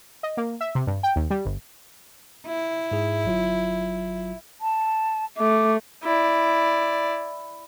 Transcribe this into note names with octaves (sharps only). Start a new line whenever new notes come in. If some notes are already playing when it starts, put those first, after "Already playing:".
D#5
A#3
E5
C3
G2
G5
D#2
G3
G1
E4
G#2 G#4
G1 F#3 F4
A5
A3 D6
E4 D5